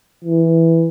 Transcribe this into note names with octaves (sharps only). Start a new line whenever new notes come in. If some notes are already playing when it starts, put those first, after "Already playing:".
E3